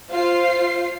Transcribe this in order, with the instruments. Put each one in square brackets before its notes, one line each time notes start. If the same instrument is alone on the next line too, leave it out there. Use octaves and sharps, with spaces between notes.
[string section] F4 C5 F5 C7